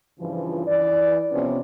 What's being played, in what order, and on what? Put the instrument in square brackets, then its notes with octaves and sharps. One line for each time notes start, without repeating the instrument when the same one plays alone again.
[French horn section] G2 C#3 E3 F3
E3 D5
C3 F3 B3 C#4